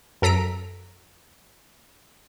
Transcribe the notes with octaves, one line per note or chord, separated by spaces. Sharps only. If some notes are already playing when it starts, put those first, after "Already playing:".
F#2 A4 A#5 B6 D7